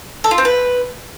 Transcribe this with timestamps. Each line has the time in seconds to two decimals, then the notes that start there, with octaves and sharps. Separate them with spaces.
0.24 A4
0.31 F4
0.38 C4
0.45 B4